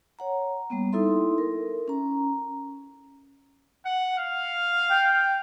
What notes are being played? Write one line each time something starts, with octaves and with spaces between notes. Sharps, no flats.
C#5 F#5 A#5
G3 A#3 B3
D#4 E4 A4 E5 C6
A#4
C#4 A#5
F#5
F5
G5